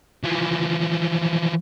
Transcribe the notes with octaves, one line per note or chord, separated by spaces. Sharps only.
E3 F3